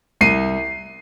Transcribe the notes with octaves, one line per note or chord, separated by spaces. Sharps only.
C2 C7 D#7